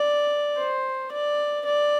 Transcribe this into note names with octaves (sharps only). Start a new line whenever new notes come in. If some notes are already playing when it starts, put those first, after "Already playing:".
Already playing: D5
C5
D5
D5